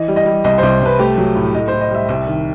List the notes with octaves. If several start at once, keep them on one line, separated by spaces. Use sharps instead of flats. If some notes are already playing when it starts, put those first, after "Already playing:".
Already playing: E3 D#5
G3
D#5
G3
C2 D#5
C2 C5
C2 B4
A3 G4
F#3
A2
A2 D#5
A2 C5
D#5
G3 E5
C2 E5
D#3